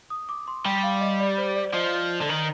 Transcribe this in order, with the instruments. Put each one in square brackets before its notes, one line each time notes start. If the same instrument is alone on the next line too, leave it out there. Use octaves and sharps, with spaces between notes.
[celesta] D#6
D6
C6
[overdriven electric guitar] G3 [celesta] G5
[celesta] F5
D#5
D5
C5
D5
[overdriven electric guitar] F3 [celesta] D#5
[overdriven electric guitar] D3
D#3